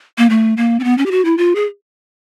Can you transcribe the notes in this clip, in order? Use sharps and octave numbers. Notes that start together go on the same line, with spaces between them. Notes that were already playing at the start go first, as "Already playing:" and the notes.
A#3
A3
A#3
C4
B3
C#4
G4
F#4
E4
F4
G#4